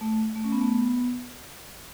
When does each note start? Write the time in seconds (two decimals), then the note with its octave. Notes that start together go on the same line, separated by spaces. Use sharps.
0.01 A3
0.36 A3
0.44 C#4
0.52 B3
0.61 A3
0.69 B3